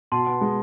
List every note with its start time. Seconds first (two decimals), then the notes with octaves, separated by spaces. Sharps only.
0.12 B2 A5 C6
0.27 B3
0.41 G#3